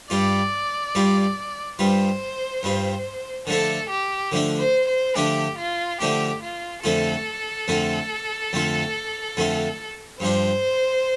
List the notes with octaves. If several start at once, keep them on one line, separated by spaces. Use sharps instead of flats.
G2 G3 F4 D5
G2 G3 F4
G2 G3 F4 C5
G2 G3 F4
D3 F3 A3 D4 A4
G4
D3 F3 A3 D4
C5
C5
D3 F3 A3 D4 G4
F4
D3 F3 A3 D4 G4
F4
F2 D3 A3 F4 A4
F2 D3 A3 F4
F2 D3 A3 F4
F2 D3 A3 F4
G2 F3 D4 F4 C5